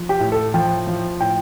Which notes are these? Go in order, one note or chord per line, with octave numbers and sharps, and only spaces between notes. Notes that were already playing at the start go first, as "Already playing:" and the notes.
Already playing: F3
G4
A2
A4
F3 G5
F3
A2 G5